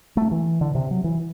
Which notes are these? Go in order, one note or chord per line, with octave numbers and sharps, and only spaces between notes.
A3
E3
D3
C3
F#3
E3